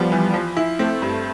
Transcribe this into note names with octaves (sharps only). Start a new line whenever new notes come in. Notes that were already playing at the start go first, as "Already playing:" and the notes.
Already playing: F3 G3 B3
E3
F3
E4
A3 C4
G2